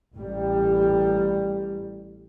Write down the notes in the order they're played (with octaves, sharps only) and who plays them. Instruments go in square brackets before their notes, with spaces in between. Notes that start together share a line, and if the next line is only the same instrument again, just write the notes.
[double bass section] A1 G3